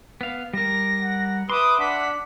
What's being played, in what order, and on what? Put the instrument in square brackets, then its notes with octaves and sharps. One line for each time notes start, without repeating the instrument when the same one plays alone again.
[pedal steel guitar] B3 F5
[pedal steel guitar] G3 A#4 [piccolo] A#6
[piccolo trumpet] F#5
[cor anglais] B4 [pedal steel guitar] E5 C6 [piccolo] D6 [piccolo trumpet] D#6
[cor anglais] D4 [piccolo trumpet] F#5 [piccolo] B6